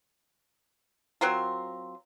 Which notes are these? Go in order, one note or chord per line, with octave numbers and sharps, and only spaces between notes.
F#3 C4 F4 A#4